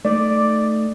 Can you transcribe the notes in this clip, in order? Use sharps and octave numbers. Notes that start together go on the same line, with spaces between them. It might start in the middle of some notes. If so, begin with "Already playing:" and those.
A3 D#4 D5